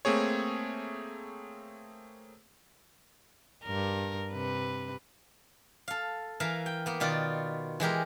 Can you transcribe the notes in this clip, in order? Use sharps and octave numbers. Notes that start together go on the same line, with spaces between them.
A3 A#3 C4 G#4 C#5
G2 A#4
C3 B4
A4 F5
E3 A#4 E5 F5
G5
A#3 B3
B2 D#3 F4 D5
E3 G#3 G4 A#4